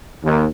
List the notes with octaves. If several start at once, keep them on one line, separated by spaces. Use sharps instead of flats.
D#2